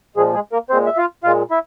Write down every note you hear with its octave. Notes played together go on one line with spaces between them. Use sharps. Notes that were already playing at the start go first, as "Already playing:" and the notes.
A#2 F3 G#3 G#4
G#3 G#4
A#3 A#4
A#2 G#3 C4 C5
E5
F4 F5
A#2 G#3 F4 F5
E4 E5